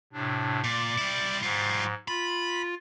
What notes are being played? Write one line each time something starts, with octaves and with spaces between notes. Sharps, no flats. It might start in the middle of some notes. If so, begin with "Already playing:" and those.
A2 C3 D4
A#2 D5 D6
G3 E4
G#2 G3 F4
F4 B5